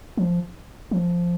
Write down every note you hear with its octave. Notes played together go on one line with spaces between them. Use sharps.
F3
F3